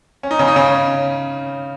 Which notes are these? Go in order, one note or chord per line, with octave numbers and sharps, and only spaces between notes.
C#4
D#4
C#3 C#4
D#4
C#3 C#4